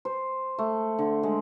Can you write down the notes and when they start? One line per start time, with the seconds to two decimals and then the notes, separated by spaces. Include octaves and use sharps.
0.05 C5
0.58 A3
0.99 D3
1.23 G#3